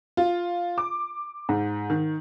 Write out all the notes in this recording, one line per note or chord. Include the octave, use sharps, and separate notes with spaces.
F4
D6
G#2
D#3